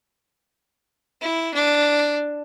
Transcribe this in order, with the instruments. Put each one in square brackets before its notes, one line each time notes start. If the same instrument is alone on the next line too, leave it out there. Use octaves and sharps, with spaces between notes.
[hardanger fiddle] E4
D4